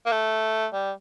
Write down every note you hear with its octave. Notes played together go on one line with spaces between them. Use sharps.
A#3
A3
G3